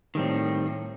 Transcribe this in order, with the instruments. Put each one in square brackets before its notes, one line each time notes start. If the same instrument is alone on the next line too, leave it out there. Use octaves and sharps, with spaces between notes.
[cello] A2 [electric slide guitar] D#3 G3 C4